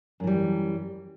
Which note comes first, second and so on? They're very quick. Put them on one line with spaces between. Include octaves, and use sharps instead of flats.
F#2 E3 G3